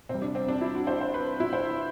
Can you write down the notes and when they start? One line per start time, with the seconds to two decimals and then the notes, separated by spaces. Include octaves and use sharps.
0.09 C3 C4
0.14 G3
0.22 D4
0.35 C4
0.48 D4
0.61 E4
0.75 F#4
0.87 C5
1.01 C5
1.14 B4
1.40 E4
1.53 C5